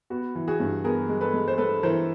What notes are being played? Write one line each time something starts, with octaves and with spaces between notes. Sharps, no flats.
B3 F#4
E3
F#4 G#4
G2
B3 G#4 A#4
G#3
A4 B4
G#3
C5
G#3 A4 B4
E3 A#4 C5